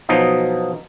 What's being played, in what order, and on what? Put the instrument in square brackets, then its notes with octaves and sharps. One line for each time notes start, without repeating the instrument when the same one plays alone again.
[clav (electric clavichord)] B2 F3 F#3 D#4 D#5